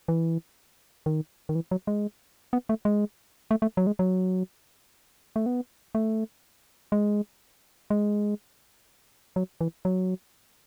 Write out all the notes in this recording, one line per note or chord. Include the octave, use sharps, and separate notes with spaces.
E3
D#3
D#3
E3
F#3
G#3
B3
A3
G#3
A3
A3
F#3
G#3
F#3
A3
B3
A3
G#3
G#3
F#3
E3
F#3